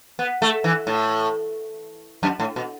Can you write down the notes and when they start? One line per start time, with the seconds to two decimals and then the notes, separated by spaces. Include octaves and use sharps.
0.19 B3
0.42 A3
0.64 E3
0.87 A2
2.23 F#2
2.40 A2
2.56 B2